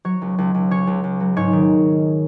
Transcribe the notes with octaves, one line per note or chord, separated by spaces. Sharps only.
F#3 C#5
C#2
C#2
C#2
C#3 C#5
C#2
C#2
F#3
G#2 C#5
D#3